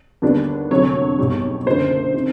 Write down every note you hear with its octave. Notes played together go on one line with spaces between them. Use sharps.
D#2 D3 G3 B3 D4
F1 F2 D3 F#3 C#5
B1 B2 G3
F#1 F#2 D3 C5
C3 D#3